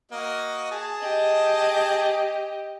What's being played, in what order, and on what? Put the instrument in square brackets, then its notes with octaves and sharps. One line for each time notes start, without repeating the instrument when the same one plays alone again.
[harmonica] A#3 F#4 D#5
G#4 A5
[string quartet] G4 D#5